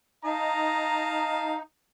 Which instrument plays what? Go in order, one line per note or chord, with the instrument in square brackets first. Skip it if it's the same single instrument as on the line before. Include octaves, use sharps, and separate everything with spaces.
[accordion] D#4 [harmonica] D#5 F5 A5 [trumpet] A#5